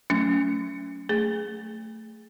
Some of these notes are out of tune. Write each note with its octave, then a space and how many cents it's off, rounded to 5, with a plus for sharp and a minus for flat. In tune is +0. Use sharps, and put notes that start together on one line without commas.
F#3 +0 A3 +15 C#4 +25
A3 +10 G#4 +0